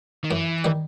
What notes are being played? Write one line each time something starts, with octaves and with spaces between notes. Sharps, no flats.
D#3
F#2 E3
D#3 G3